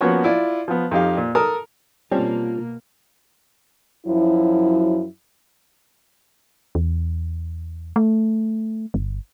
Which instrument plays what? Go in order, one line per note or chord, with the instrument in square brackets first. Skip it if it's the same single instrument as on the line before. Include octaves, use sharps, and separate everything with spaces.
[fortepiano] F3 A#3 B3 C#4 F#4 C#5
E4 F4 D5
F3 B3
F2 D#4 G4 F5
A#2
A4 A#4 A5 D#6
[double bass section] B2 A#3 [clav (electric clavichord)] G3 C4 C#4 [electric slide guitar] F4 A5
[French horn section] F#2 F3 F#3 E4
[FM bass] E2
A3
G1